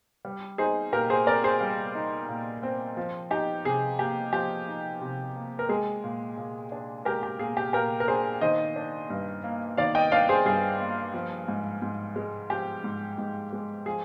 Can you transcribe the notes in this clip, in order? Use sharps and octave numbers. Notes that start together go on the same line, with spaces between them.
G3
D#4 G#4 C5
A#2 G4 A#4
G#4 C5
C4 A#4 D5
G#4 C5
G3
D#4
A#2
C4
F3
D#4 G4
C3 G#4
A#3 G4
F3 G4
D#4
C3
A#3
A#4
G#3 G#4
A#2
A#2
D4
G#3 G4 A#4
G4
A#2 G#4
G4
A#2 G4 A#4
A#4
D4 G#4 C5
D#3 C5 D#5
D4
G2
A#3
D#3 D5 F5
D#5 G5
D4 D5 F5
G#4 C5
G2 G#4
A#3
F3
G#2
G#2
G#3
F3 G4
G#2
G#2
G#3
F3 G#4